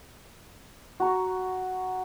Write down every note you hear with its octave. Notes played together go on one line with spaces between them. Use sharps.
F#4 A#5 C#6